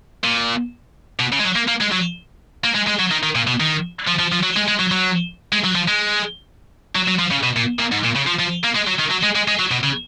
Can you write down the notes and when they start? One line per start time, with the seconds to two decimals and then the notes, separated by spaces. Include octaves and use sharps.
0.24 A#2
1.19 B2
1.32 C#3
1.39 G#3
1.44 F#3
1.56 A#3
1.68 A#3
1.80 G#3
1.92 F#3
2.64 A#3
2.75 G#3
2.87 G#3
2.99 F#3
3.11 D#3
3.23 D#3
3.35 A#2
3.47 B2
3.60 D#3
4.08 F3
4.19 F3
4.32 F3
4.43 F#3
4.56 G#3
4.68 G#3
4.79 F#3
4.91 F#3
5.52 G#3
5.64 F#3
5.75 F3
5.88 G#3
6.95 F#3
7.08 F#3
7.19 F3
7.31 C#3
7.43 B2
7.56 A#2
7.79 A#2
7.92 G#2
8.04 A#2
8.16 C#3
8.27 F3
8.40 F3
8.64 A#3
8.76 G#3
8.88 F#3
9.00 D#3
9.11 F#3
9.23 G#3
9.36 G#3
9.48 G#3
9.59 F#3
9.71 B2
9.83 C#3